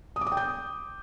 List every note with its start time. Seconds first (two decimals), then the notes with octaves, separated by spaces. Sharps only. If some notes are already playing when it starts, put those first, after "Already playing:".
0.16 D#6
0.21 D6
0.27 D#6
0.32 G5
0.37 G6